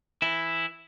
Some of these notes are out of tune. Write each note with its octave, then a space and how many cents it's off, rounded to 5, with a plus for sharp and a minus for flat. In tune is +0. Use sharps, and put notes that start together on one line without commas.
E3 +0 E4 +0